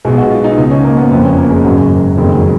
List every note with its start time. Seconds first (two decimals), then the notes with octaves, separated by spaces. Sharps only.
0.05 B1 B2 G#3
0.18 F#4
0.31 F4
0.44 D#4
0.58 C#2 B2 D#4
0.71 C#4
0.84 A#3
0.97 B3
1.11 F#1 F2 F3 B3
1.25 C#4
1.38 A#3
1.51 G#3
1.64 G#1 F#2 C#3 F#3
2.17 F#1 F2 D#3 G#3
2.35 F#3